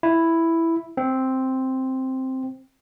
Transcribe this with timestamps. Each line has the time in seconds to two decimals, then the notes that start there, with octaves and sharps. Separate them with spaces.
0.03 E4
0.97 C4